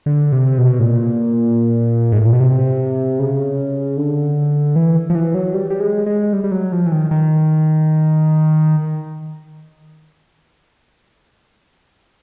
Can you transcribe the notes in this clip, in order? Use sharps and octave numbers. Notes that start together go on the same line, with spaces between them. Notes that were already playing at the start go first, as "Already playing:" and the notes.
D3
C3
B2
A2
A#2
G#2
A2
A#2
B2
C3
C#3
D3
E3
F3
E3
F#3
G3
G3
G#3
G#3
G3
G3
F#3
F3
E3
D#3
D#3